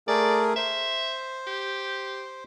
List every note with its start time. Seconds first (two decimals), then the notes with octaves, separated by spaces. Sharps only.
0.08 A3 G#4 A#4 D5
0.56 C5 E5
1.47 G4